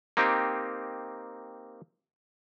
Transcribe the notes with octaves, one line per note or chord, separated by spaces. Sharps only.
A#3 C4 D#4 G4